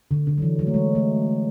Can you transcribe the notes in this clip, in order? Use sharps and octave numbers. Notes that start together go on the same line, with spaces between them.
D3
D3
F#3
E3
F#3
A3
G#3
A3